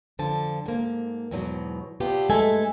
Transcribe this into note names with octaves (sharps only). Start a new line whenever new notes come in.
F2 D3 F3 A5
G#2 A#3
E2 G#2 B2 F#3
C3 B3 D4 F4 G4
G2 G#3 A3 A4 G#5